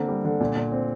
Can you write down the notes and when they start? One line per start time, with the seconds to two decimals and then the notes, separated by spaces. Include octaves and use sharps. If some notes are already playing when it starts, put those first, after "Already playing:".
Already playing: D3 A#3 C4
0.08 G3
0.24 D3
0.40 A#2
0.56 A#2
0.72 C4